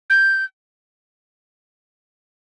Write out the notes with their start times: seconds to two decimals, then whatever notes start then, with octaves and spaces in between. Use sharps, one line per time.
0.10 G6